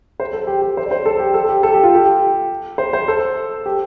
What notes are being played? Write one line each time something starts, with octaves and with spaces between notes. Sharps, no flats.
C5
A4
G4
G4
C5
D5
C5
A4
G4
A4
G4
A4
G4
F4
G4
C5
C5
A4
G4